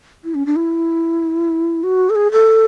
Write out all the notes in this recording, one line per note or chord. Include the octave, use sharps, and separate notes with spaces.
E4
C#4
D4
E4
F#4
A4
G#4
A4